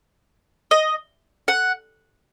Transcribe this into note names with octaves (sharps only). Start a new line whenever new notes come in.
D#5
F#5